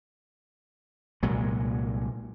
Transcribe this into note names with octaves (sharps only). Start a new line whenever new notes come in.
C2 A#2 F#3 G#3